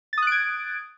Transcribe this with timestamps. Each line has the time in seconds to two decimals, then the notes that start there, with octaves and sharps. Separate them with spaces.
0.13 A6
0.18 D#6
0.22 F#6
0.27 D7
0.32 G#6